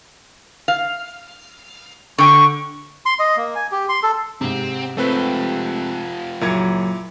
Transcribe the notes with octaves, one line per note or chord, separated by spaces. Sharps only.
F5
D3 G5 C#6
C6
D#5
A#3
G#5
G4
C6
A4
G#2 C3 C4
F3 A3 C4 G4 B4
F#1 A#2 F#3 E4 A#5 G#6 C#7